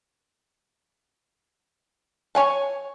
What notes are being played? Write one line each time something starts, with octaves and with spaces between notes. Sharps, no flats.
C#5 G#5 A5